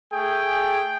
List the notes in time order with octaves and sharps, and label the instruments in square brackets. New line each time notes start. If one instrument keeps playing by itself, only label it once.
[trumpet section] A3 G#4 G5